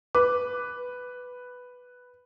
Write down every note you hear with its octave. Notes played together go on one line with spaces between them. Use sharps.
B4 D6